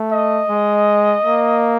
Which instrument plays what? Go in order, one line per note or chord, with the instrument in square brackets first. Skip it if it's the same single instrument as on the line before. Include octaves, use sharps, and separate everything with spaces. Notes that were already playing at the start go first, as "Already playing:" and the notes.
Already playing: [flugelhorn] A3
[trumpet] D#5
[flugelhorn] G#3
A#3